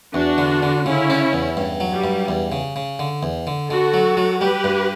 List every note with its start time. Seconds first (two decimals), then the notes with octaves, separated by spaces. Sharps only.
0.14 E2 D4 F#4
0.38 D3
0.63 D3
0.85 C#3 C#4 E4
1.10 D4
1.33 E2
1.57 G2
1.80 F#3
1.92 G3
2.04 G2
2.28 E2
2.52 C#3
2.76 C#3
2.99 D3
3.23 E2
3.47 D3
3.70 D3 F#4 A4
3.94 F#3
4.17 F#3
4.41 G3 G4 B4
4.64 G2